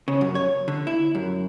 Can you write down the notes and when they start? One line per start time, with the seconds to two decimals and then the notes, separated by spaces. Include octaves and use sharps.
0.08 C#3
0.21 F#2
0.35 C#5
0.68 D3
0.87 E4
1.15 F#2